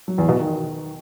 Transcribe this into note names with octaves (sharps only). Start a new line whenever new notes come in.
F#3
E2
B2
D#3